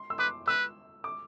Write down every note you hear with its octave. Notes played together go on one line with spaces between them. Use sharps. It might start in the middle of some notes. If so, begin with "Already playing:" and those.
Already playing: C6
E6
B4 D6
B4 E6
D6